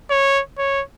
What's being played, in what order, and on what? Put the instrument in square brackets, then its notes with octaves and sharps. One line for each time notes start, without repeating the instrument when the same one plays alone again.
[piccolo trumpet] C#5
C#5